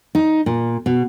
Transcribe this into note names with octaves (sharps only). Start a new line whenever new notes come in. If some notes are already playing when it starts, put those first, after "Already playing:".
D#4
A#2
B2